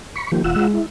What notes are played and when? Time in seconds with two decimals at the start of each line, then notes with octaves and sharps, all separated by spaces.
0.16 B5 C#6
0.32 D#3 F3 A#3 G4
0.44 E1 F4 F#5 E6
0.56 G#3
0.73 E4